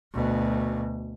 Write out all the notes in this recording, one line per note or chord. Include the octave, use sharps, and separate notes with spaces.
D2 B2